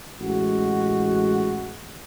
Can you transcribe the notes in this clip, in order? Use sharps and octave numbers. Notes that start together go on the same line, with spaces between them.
A1 G#3 F#4